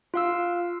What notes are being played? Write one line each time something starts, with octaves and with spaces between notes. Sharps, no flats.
F4 F5 E6